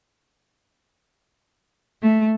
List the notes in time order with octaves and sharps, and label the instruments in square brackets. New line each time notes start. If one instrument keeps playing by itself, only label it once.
[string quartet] A3